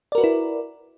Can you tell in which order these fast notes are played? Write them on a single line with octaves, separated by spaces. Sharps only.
D5 A#4 F#4 B4 E4